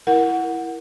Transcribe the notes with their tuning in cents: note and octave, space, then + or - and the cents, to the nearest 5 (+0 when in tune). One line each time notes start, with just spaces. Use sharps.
E4 +5 A#4 +15 F#5 -5